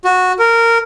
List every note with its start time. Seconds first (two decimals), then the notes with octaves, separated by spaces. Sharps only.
0.05 F#4
0.39 A#4